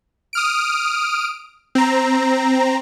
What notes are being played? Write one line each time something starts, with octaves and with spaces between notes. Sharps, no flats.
D#6 F6 D7
C4 A#5